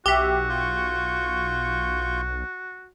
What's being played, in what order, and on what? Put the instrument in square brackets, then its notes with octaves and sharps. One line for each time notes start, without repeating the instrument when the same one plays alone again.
[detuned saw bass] B1 [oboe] F#4 [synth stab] G4 E5
[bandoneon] F4 C#6 G6